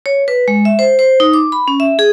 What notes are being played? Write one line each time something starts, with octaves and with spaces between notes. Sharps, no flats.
C#5
B4
G#3
E5
C5
C5
D#4
D6
B5
C#4
E5
G#4